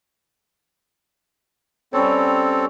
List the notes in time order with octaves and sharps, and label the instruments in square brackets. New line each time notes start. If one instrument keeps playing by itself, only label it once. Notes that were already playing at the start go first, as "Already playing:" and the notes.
[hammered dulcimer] G3 C#4 C#5 [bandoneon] C4 A4